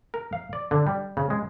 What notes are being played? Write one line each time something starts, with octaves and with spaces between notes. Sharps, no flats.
A#4
F5
D5
D3
G3
C#3
G#3